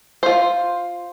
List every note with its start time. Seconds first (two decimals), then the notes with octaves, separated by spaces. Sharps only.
0.23 F4 C5